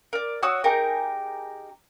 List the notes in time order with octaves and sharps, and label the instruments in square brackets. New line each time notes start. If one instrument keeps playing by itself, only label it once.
[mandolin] A#4 D5
F#4 C#5 D#6 E6
D#4 G4 G#4 A#4